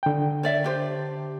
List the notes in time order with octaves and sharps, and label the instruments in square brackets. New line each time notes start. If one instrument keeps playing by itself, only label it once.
[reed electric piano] D3 G5
[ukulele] C#5 D5 E5
D4 G4 C5